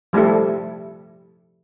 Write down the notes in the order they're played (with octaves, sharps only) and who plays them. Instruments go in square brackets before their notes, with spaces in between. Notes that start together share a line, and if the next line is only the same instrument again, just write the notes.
[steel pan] F3 G3 A3 E4 A4